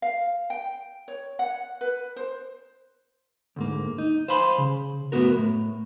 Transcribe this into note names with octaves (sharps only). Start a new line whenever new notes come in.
F5
G5
C#5
F#5
B4
C5
D2 G#2 A#3
D#4
C5 F5 G#5 B5 C6
C#3
F#2 A2 B3 F#4 A#4
A2